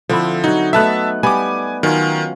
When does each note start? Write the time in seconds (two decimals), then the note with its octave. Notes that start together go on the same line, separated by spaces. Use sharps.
0.09 D3 F3 C4 E4
0.44 F#3 D#4 F#4
0.73 A3 B3 D#4 E5 A5 F#6
1.23 G3 B3 G4 G#5 D6
1.83 D#3 F#3 C#4 F4